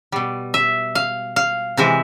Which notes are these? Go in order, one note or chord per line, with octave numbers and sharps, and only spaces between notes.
B2 G3
E5
F5
F5
C3 E3 G#3 E5